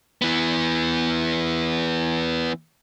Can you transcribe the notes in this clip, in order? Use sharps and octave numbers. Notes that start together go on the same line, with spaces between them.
E3 B3